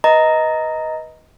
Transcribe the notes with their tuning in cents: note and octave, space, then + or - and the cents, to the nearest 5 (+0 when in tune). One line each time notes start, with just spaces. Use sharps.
B4 -15 D#5 +15 A#5 -5